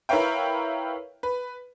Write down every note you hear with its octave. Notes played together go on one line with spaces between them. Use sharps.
E4 A#4 B4 C#5 F5 G5
B4